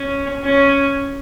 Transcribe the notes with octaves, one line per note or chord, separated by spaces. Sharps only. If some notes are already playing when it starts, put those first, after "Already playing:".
Already playing: C#4
C#4